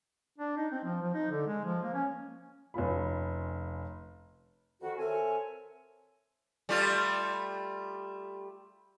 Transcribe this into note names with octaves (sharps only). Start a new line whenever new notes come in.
D4
D#4
C4
F3
F3
D#4
D3
G#3
F3
A#3
C#4
F1 C#4 F4 B5
F2 D#3 F#4
C4 A4 A#4 C#5 E5 G#5
G3 A3 F4